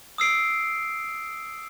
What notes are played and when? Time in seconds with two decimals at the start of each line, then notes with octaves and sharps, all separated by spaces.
0.18 D#6 E6 C7 D7